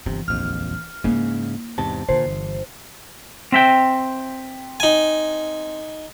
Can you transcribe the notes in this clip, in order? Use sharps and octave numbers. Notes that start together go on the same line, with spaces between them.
G1 C3 E3
D#1 A#1 F2 E3 F6
G#2 C#3 A#3 E4
E2 G#2 C3 A5
A#2 D3 E3 C5
G1
C4 E5 G5
D#4 G#5